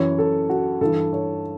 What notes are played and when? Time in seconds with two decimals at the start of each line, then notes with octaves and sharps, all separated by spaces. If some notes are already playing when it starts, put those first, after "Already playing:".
Already playing: F#2 E3 C#5
0.18 A4
0.49 F#4
0.81 G2 E3 A4
1.13 C#5